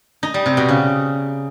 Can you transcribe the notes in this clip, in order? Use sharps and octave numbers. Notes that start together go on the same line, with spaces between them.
D#4
G3
C3
B2
C#3